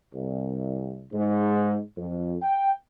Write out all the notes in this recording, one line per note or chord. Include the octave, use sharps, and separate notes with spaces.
C2
G#2
F2
G5